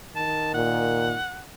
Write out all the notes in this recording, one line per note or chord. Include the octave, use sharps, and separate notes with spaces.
D#3 A5
A#2 F#5